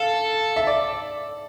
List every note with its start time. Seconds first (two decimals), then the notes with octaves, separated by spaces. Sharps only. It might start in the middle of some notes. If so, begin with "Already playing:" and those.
Already playing: A4 F5
0.56 E5
0.67 D5